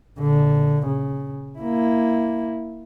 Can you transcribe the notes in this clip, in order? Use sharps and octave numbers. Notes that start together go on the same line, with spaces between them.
A#1 D3
C#3
A#3 E4